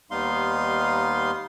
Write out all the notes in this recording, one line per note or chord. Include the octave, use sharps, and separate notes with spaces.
D#2 G3 B3 D#4 F5 C6